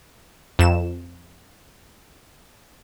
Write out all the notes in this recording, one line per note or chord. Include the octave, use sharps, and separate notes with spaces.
F2 E7